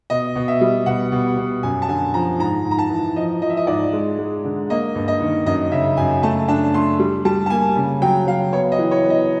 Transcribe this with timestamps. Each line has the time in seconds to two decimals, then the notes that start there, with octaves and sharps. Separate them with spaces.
0.10 B2 D#5
0.36 B2
0.48 E5
0.61 G3
0.86 B2 F#5
1.12 B2
1.38 B2
1.63 F#2 G#5
1.82 A5
1.89 D3 G#5
2.14 F3 A#5
2.39 G#2 A#5
2.66 G#2
2.71 A#5
2.79 A5
2.91 E3
3.16 F3 D#5
3.42 F3 D#5
3.50 E5
3.57 D#5
3.67 G#2 D5
3.93 G#3
4.18 G#3
4.44 D3
4.70 A#3 D#5
4.95 G2
5.08 D#5
5.21 D#3
5.46 F#2 D#5
5.72 C#3 E5
5.97 F#2 G#5
6.23 A3 A5
6.48 D4 A5
6.74 A3 C6
6.99 G3
7.25 G3 A5
7.46 A5
7.50 A#3 G#5
7.76 C#3
8.02 F#3 G5
8.27 F#3 F5
8.53 B3 C#5
8.72 D#5
8.78 E3
8.91 C#5
9.04 B3
9.10 D#5